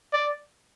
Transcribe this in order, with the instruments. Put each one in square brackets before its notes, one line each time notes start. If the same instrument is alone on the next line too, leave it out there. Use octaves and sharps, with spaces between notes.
[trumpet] D5